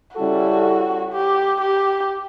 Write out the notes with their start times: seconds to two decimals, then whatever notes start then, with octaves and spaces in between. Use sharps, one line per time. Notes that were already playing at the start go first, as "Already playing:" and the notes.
0.16 C#3 G3 C#4 E4 F#4 A4
1.12 G4
1.61 G4